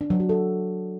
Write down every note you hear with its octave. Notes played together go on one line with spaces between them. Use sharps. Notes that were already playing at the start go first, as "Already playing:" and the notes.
D4
F#3
F#4
A4